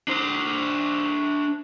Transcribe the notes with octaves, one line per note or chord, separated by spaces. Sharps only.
D4 C5